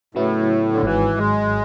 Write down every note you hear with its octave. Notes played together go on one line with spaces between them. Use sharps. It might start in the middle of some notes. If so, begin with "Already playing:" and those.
A2 C#3 F#3 B3 E4
D3
G#1 G#2 E3 F#3
G#3